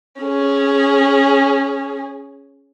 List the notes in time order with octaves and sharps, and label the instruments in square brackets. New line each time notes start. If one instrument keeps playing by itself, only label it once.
[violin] C#4 G#4